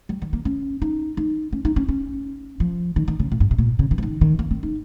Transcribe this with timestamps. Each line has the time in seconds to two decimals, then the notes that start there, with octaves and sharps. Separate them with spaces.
0.09 G3
0.22 D#3
0.33 A#3
0.45 C#4
0.82 D#4
1.17 D#4
1.53 C#4
1.65 D#4
1.76 C#4
1.88 C#4
2.60 F3
2.96 D#3
3.08 D#3
3.20 C#3
3.32 A#2
3.40 G2
3.51 C3
3.58 A#2
3.79 C#3
3.91 D#3
3.98 F3
4.03 D#3
4.21 D#3
4.39 A#3
4.51 C4
4.63 D#4